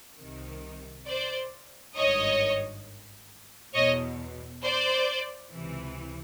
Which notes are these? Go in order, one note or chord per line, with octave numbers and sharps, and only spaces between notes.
C2 C3 D#3
C5 D5
G#1 G2 D#3 C#5 D#5
E2 B2 C#5 D#5
C5 D5
C#2 C3 E3